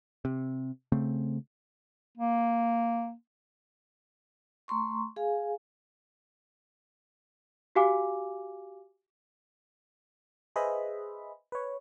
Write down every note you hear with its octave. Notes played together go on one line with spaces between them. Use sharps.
C3
C#3 A3 C4
A#3
A3 A#5 C6 C#6
G#4 F5 G#5
F#4 G4 F5 G#5 D6
G#4 B4 C5 D#5 E5 B5
B4 C#5